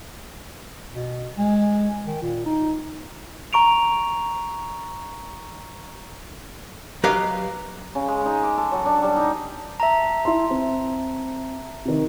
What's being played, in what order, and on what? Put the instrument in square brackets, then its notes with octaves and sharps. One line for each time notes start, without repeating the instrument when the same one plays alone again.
[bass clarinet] B2
G#3
D#3
A#2
D#4
[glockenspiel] A#5 C#6 D7 F7
[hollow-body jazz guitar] F#3 G4 B4 D#5 F5
[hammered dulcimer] C#3
G#3
D#4
D6
A4
F#3
D4
G3
D#4
[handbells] E5 A5 A#5
[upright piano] E4 C6
C4
C3 D#3